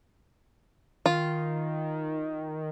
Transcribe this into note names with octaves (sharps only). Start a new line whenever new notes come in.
D#3 F4